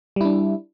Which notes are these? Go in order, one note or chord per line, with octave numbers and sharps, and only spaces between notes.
G3 D4 E4